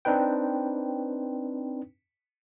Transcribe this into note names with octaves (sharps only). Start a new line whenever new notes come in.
C4 D4 D#4 B4 G5